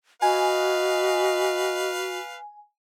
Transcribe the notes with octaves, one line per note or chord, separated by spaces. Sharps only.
F#4 B4 D#5 F5 G#5